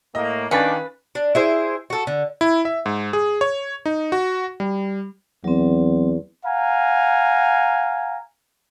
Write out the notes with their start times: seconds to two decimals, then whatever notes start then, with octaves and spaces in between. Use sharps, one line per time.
0.15 A2 A#3 D#5
0.51 D#3 C#4 D4 B4 F5 G#5 A6
1.15 D4
1.35 E4 G#4 C5
1.90 F#4 A4
2.07 D3
2.41 E4
2.65 E5
2.86 G#2
3.13 G#4
3.41 C#5
3.86 D#4
4.12 F#4
4.60 G3
5.44 E2 F#3 C4
6.45 F5 F#5 G#5 A#5